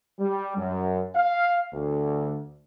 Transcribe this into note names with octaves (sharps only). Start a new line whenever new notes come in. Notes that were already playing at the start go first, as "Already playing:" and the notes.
G3
F#2
F5
D2